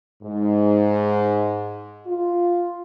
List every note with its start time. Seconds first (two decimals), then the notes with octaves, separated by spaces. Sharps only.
0.23 G#2
2.06 F4